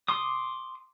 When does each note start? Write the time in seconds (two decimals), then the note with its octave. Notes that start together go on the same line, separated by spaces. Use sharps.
0.08 C6 D6 D#6